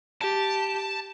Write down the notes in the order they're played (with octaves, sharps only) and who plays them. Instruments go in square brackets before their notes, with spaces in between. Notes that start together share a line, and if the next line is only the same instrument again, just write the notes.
[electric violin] G4 [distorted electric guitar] A5